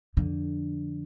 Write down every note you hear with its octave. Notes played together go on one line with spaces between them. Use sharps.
F2 D3